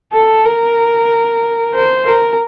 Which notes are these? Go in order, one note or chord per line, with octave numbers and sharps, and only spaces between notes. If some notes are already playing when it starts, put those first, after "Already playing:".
A4
A#4
C5
A#4